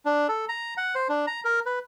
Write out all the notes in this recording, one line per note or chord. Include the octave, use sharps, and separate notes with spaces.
D4
A4
A#5
F#5
C5
D4
A#5
A#4
B4